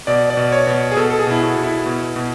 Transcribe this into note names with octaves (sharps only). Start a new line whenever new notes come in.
B2 D5
D5
B2
C#5
B2
G#4
B2 A4
A4
G#4
B2 E4
F#4
B2
E4
B2
B2